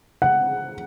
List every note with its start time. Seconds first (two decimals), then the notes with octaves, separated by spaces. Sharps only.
0.22 F#5